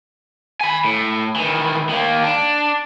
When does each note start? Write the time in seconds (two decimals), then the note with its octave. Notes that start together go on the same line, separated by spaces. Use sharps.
0.61 G#5 B5
0.84 A2
1.36 D#3 E3
1.89 D#3 A#3
2.24 D4